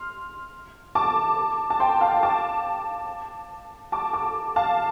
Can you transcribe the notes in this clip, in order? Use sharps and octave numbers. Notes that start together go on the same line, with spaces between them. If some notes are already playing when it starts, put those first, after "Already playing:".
Already playing: C6 F6
A5 D6
A5
G5 C6
F5 A5
A5 D6
A5 D6
A5 D6
F5 A5